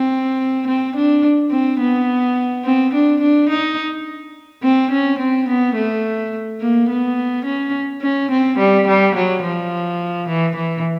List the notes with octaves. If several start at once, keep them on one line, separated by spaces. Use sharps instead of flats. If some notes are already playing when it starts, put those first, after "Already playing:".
Already playing: C4
C4
D4
C4
B3
C4
D4
D4
D#4
C4
C#4
C4
B3
A3
A#3
B3
C#4
C#4
C4
G3
G3
F#3
F3
E3
E3